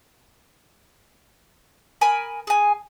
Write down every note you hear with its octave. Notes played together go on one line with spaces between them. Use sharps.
A#4 G#5 B5 D#6
G#4 G#5